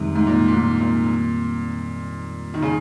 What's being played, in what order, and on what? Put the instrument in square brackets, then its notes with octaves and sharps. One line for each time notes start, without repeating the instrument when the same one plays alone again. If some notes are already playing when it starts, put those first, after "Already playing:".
Already playing: [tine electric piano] F2 D#3 G3 C4 [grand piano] G#2 C3
[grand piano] G#2
A#2
A#2
G#2
A#2
D#3
C#3